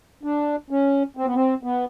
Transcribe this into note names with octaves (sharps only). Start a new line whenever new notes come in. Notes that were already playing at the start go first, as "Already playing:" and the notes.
D4
C#4
C4
B3
C4
B3